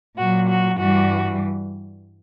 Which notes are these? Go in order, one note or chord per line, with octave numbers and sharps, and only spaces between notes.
A#2 F#3 F#4
F#4
G2 E3 G3 F#4